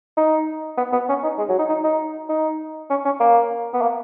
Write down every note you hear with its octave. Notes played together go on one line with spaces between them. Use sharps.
D#4
B3
B3
C#4
D#4
G#3
F#3
D#4
D#4
D#4
D#4
C#4
C#4
A#3
B3
A#3